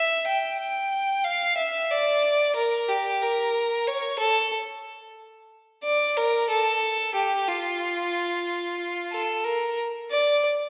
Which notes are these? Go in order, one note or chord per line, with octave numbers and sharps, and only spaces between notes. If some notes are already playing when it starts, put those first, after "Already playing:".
Already playing: E5
G5
G5
F5
E5
D5
A#4
G4
A#4
C#5
A4
D5
A#4
A4
G4
F4
A4
A#4
D5